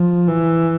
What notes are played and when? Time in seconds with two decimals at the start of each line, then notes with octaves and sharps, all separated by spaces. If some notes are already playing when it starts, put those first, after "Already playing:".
Already playing: F3
0.28 E3